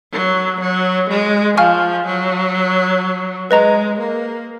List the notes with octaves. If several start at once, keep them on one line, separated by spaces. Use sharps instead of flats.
F#3
F#3
G#3
F3 F5 G#5 C#6 F6
F#3
G#3 B4 D#5 A#5
A#3